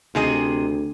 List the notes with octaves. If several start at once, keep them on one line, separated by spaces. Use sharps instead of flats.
D2 C3 G#4 D#5